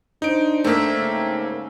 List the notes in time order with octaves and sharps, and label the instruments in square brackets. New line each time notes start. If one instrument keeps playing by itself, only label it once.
[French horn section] D4 C5 [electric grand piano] D#4 D7
[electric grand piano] A3 A#3 [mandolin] C4 E5
[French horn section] G#2 C#3